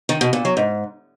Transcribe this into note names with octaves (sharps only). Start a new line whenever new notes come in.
D#3
B2
A#2
F#3
G#2